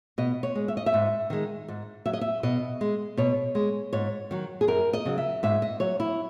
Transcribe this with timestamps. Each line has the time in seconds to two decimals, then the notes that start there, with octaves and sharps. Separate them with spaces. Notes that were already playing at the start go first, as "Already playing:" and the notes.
0.18 B2 D#5
0.43 C#5
0.55 G#3
0.68 E5
0.77 D#5
0.86 E5
0.94 G#2
1.30 D#3 G#3
1.68 G#2
2.06 F#3 E5
2.13 D#5
2.21 E5
2.43 B2 D#5
2.81 G#3
3.17 B2 C#5
3.55 G#3
3.93 G#2 C#5
4.31 D#3 F#3
4.61 G#4
4.68 F#2 A#4
4.93 D#5
5.05 C#3 F#3
5.18 E5
5.43 G#2 E5
5.62 D#5
5.80 F#3 C#5
6.00 E4